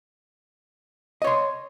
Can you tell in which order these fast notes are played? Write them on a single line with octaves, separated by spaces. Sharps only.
D#5 C#5 C6